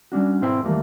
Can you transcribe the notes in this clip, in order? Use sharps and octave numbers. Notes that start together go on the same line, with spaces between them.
G3 C#4 D4 F#4
B1 G#2 C4 E4 C5 G5
D#2 E3 F3 G3 A3 A#3